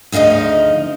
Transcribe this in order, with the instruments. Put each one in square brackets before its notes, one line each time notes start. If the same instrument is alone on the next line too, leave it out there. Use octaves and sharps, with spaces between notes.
[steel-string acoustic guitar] D2 C#3 F3 D#4 D#5